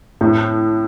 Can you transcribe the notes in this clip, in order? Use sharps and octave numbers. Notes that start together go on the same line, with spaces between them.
A2